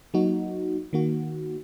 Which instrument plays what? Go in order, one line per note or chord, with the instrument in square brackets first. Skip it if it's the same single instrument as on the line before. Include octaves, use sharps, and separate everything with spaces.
[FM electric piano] F#3 A#3 D#4 F#4
D#3 A#3 F#4